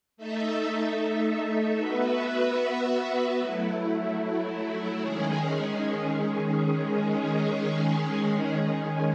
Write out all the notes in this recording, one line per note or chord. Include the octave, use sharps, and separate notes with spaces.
A3 D#4 A4 E5
B3 F#4 B4 E5
F#3 A3 E4
D#3 G#3 C#4 G#4